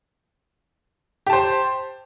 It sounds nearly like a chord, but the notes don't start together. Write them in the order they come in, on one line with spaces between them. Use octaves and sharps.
G4 A5 C5